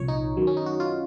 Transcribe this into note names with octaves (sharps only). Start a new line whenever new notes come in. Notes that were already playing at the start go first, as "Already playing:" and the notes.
Already playing: C2 A#2 F3 C#5
D#4
F#2 D#3 F#3
C#4
D#4
F#4
F4